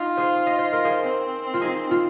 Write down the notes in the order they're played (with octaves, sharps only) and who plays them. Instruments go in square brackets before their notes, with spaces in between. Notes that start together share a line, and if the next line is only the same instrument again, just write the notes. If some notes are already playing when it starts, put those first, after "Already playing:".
Already playing: [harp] D#4 [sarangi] F4
[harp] G#4 C5
D#5
C5
A#4
G#4 C5
[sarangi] C4
[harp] F4
D#4 G#4
F4